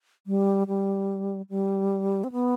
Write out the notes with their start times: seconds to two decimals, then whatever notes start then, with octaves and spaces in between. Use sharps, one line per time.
0.27 G3
0.68 G3
1.50 G3
2.24 C4
2.32 B3